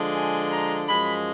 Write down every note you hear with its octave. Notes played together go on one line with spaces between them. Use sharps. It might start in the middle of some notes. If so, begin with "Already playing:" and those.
Already playing: D3 F3 G#3
G#5
A#5
F#2 F3 G#3 B5